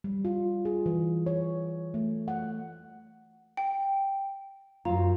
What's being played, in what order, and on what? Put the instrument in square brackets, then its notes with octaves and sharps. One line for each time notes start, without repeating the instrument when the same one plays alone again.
[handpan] G3
F4
G#4
E3
C#5
A3
F#5
[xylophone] G5
[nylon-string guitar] F#2 F#3 F4 [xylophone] A#5